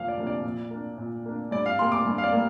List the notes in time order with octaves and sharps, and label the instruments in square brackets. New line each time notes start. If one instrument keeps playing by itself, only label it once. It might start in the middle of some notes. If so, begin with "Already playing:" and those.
Already playing: [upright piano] F2 C3 F3 A#3 D4 F5
D5
C3 F3 A#3 D4
D5
A#2
A#3 D4
A#2
A#3 D4
G2 D5
F5
G3 A#3 C6
D6
G2
F5
D5
G3 A#3